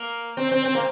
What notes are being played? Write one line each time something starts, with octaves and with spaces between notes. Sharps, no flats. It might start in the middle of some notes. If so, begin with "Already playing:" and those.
Already playing: A#3
C4
C4
C4
A#3